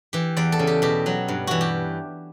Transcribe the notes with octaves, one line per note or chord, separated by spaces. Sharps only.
E3 G4
E2 D5
A4
C#3
G4
B2 G4
F#3
G2
E3 F#4
G4